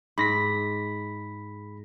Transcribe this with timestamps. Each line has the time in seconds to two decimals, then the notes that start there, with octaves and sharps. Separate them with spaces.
0.18 G#2 B5 A#6 B6